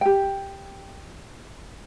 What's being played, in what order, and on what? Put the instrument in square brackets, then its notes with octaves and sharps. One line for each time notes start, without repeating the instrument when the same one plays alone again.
[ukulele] G4 G5